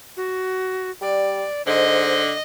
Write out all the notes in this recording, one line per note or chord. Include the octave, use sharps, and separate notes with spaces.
F#4
G3 D5
G#2 D3 C5 D#5